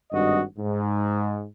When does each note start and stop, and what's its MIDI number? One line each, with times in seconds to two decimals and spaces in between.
0.12 0.41 32
0.12 0.41 43
0.12 0.41 66
0.12 0.41 75
0.59 1.44 44